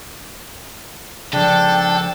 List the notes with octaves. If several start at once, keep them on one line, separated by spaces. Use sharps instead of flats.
C#3 F3 D4 A4 G5